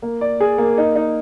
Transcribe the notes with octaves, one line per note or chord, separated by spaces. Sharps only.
A#3
D5
G#4
A#3
D#4
D#4